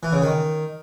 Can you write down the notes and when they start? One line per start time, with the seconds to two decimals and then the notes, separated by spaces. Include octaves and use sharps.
0.03 E3
0.13 C#3
0.22 D#3